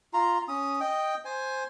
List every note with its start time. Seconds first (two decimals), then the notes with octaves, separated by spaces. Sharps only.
0.13 F4 A#5
0.48 C#4 D#6
0.80 D#5 G5
1.25 C5 G#5